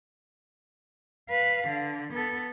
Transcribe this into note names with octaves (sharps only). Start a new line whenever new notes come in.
B4 F5
D3
B3 A4